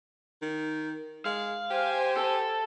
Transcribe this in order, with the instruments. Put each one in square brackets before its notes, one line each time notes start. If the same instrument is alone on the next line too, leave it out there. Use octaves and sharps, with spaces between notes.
[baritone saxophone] D#3
[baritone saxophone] G#3 [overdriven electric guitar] F5
[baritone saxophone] G4 [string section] C5 G#5
[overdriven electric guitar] A4